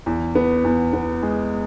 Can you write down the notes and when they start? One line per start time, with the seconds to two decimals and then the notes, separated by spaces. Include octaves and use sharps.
0.06 E2
0.35 B3
0.64 E2
0.93 B3
1.22 G#3